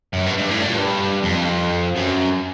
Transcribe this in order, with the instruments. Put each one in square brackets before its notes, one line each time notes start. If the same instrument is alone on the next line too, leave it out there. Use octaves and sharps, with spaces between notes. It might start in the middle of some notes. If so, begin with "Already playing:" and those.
[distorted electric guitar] F#2
G2
G2
A2
A#2
G2
F2
F#2